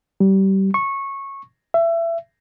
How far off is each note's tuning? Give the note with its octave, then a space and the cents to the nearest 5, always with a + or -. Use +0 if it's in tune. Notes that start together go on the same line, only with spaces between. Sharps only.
G3 -25
C#6 -15
E5 +25